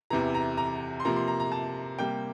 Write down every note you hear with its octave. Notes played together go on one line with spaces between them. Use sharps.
E2 C3 E3 A#5
A#5
A#5
C6
C3 F3 A#3 A#5
C6
A#5
A#5
A5
C3 G3 A#3 G5